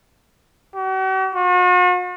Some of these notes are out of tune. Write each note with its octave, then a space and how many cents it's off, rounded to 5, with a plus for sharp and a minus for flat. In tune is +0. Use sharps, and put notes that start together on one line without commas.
F#4 +45
F#4 -45